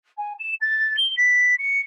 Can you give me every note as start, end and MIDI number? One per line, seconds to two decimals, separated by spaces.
0.17 0.33 80
0.39 0.52 100
0.61 0.96 93
0.97 1.15 103
1.17 1.54 95
1.58 1.79 97